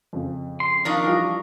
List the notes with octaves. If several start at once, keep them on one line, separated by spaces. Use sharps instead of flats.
F2 C#3
C6
F3 D4 D#4 A#4 F5 C#6 D#6
E3 G3 F4